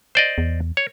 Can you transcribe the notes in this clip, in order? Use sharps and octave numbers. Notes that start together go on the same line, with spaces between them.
C5 D5 D#5
E2
C#5